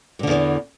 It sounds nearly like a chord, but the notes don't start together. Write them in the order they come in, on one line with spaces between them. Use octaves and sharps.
G2 D3 E2 E3